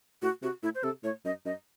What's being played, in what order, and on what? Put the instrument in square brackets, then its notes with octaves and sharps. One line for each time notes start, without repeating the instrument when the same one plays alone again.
[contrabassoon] A2 [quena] F#4
[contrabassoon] C3 [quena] F#4
[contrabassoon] A2 [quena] E4
[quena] C5
[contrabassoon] C3 [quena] A4
[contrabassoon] A2 [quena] C#5
[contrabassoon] F#2 [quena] D#5
[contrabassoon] F#2 [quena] D#5